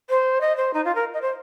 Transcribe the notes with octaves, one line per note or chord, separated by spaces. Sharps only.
C5
D#5
C5
D#4
F4
A#4
D#5
C5